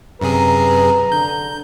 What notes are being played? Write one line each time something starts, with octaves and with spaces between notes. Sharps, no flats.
F#2 C3 G#4 B4 A#5
D3 G6